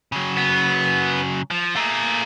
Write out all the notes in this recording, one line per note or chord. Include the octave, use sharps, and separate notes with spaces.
C#3 F#3
B3
F3
A3 F4 G#4 A#4